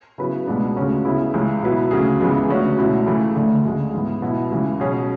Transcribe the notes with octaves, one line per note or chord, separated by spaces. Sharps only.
C#3 F#3 B3 E4 B4
C#2 B2 G#3 B3 D4
D2 C#3 G#3 C#4 F#4
C#3 G#3 B3 E4
C#2 C#3 E3
B2 F#3 B3 E4 B4
D2 C#3 F#3 C#4 G#4
C#2 C#3 E3 G#3 B3
D3 A3 C#4 F#4
C#2 B2 A3 E4
C#3 E3 A3 E4
D2 D3 A3
D2 C#3 G#3
G#2 E3 B3
B2 F#3 B3 E4
C#2 C#3 E3
B2 F#3 C#4 G#4